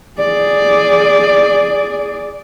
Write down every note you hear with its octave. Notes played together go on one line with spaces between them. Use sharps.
G#4 D5